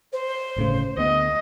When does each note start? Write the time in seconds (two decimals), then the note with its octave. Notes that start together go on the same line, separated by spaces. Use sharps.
0.12 C5
0.56 G1 A2 C#3
0.98 D2 B3 D#5